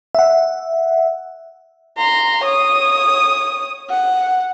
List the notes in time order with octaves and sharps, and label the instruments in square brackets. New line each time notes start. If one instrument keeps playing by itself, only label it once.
[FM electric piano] E5 F#5
[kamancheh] A#5 C6
C#5 D#6
F#5